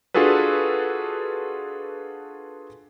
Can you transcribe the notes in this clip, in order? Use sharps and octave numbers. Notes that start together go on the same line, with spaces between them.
D4 F4 F#4 G#4 A4 B4